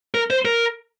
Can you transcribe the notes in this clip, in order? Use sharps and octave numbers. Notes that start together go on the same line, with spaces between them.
A#4
C5
A#4